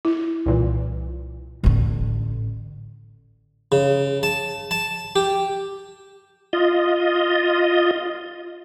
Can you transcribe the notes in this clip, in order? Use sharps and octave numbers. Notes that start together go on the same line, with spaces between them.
E4
C2 A#2 E3
A1 D3
C#3
A5
A5
G4
F4 D#5